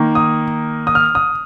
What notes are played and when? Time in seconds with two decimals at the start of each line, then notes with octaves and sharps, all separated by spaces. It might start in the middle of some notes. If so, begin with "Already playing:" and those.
Already playing: D#3 A#3
0.15 D#6
0.87 D#6
0.95 F6
1.15 D#6